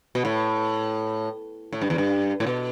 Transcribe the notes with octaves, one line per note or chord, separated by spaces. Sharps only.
B2
A2
A2
G2
E2
G2
A2
B2